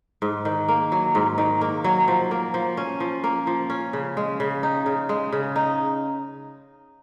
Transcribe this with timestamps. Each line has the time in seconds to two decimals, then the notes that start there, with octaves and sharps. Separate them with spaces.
0.22 G#2
0.45 D#3
0.68 A#3
0.92 F#3
1.15 G#2
1.38 D#3
1.61 A#3
1.84 F#3
2.08 F3
2.31 A#3
2.54 F3
2.77 C#4
3.00 F3
3.24 A#3
3.47 F3
3.70 C#4
3.93 C#3
4.17 G#3
4.40 C#3
4.63 D#4
4.86 C#3
5.09 G#3
5.32 C#3
5.56 D#4